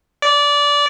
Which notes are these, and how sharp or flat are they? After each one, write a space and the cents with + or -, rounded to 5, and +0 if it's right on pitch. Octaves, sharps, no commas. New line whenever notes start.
D5 -20